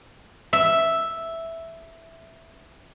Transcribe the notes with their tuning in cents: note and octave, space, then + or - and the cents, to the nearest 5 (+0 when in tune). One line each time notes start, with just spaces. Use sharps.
E5 +0